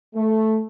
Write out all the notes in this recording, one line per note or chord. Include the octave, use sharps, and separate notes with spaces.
A3